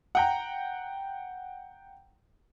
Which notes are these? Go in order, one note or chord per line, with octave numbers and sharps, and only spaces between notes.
F#5 G5 A#5